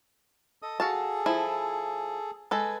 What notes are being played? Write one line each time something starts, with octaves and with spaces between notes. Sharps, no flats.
A4 D#5 D#6
F#4 G#4 A4 F5 A5
F3 E4
G#3 A4 B4 G#5